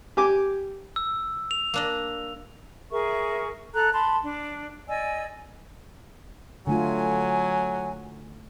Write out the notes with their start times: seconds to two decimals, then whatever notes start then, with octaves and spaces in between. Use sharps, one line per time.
0.17 G4 G#5 D6
0.96 E6
1.51 F7
1.74 A#3 D4 D#5
2.91 G#4 A#4 E5 C#6
3.74 A4 A#5 F#6
3.93 A5 B5 C6
4.23 D4
4.88 D5 D#5 G#5 E6
6.67 D3 F#3 A3 F4 G#5